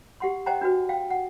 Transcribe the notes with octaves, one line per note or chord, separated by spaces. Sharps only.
G4 F#5 C6
C5 D#5 F#5 G5 A#5
D4 F#4 B4
F5 G5
F#5